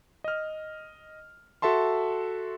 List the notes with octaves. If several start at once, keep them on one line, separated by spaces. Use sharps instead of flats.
D#5 F6
F#4 A4 E5 A5 C6